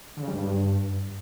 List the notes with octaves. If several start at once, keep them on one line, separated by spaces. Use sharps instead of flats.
D3
C#3
G3
G2